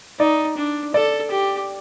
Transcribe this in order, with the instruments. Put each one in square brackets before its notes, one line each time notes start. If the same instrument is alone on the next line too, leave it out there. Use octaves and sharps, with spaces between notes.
[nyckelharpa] D#4 [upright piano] D5
[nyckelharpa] D4
[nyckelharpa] A4 [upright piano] D5
[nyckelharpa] G4